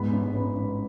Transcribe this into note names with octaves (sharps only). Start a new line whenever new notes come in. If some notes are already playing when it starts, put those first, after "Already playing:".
Already playing: G#2 B3 B5
A1
A1
A1